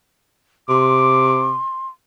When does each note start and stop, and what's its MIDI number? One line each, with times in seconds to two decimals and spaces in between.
0.69 1.59 48
0.69 1.88 84
0.69 1.51 86